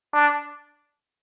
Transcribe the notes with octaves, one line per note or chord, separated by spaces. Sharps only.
D4